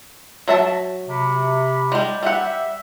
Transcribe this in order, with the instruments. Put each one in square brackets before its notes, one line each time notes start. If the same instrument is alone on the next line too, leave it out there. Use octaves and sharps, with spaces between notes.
[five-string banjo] F#3 E5 A5
[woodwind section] C3 B5
[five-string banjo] G3 G#3
[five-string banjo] G3 F#5 [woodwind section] E5